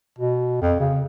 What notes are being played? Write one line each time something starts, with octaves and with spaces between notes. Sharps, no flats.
B2
F2
C#3